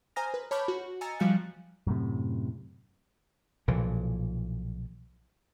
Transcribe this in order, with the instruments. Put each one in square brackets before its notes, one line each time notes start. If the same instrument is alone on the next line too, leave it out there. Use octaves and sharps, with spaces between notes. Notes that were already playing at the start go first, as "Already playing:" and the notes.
[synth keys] C5 G#5 A#5 D#6 F6 A#6
B4
C#5 A5 B5 D6 F6 G6
F#4
D#5 G#5 A#5 E6 A6 C#7
F3 G3 F#4 F5 F#6 C#7
[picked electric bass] F#2 A2 C3
[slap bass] B1 A#2 E3 F3